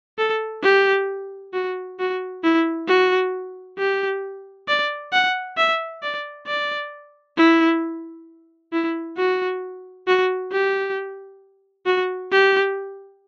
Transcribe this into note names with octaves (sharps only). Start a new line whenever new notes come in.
A4
G4
F#4
F#4
E4
F#4
G4
D5
F#5
E5
D5
D5
E4
E4
F#4
F#4
G4
F#4
G4